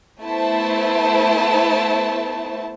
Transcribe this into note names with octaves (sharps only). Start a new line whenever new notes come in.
A3 B3 E4 C5 A5